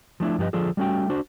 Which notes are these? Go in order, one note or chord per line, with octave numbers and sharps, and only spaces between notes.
F3 A3 D4 E4
G2 F3 G4 G#4 B4 D#5
D3 F3 D4 F4 G#4 A4
G3 A3 C#4 F#4 G5
D4 F#4 C5